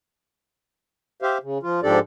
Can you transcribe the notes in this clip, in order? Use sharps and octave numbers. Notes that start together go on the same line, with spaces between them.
G4 C5 E5 F5
C#3
F3 F4
G#2 F3 D4 G4 A4 D5